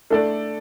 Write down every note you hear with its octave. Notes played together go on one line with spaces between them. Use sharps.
A3 D4 A4 D5